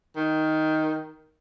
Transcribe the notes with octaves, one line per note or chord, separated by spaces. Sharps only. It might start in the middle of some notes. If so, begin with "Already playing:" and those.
D#3